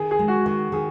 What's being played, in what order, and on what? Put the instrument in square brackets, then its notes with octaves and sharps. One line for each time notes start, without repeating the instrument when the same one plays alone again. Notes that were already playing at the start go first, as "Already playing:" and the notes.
Already playing: [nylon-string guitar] D#3 [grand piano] G#4
[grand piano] G#4
[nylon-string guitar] G#3
[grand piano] F#4
[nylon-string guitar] D#3 [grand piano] F#4
[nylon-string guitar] D#3 [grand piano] G#4